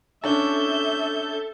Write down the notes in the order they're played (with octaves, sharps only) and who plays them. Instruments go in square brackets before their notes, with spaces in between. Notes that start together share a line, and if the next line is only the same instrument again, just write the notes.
[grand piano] C#4 D4 [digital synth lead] A4 [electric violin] E5 G6